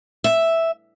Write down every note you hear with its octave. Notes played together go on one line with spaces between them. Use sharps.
E5